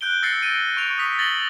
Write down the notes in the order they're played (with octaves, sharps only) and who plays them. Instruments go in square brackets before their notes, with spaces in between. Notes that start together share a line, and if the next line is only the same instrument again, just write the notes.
[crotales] F#6 G6 D7 G7
E6 G6 A6 A#6 C7 C#7
D7 D#7
C#6 D7 F7
D#6 B6
A6 A#6 F#7 G7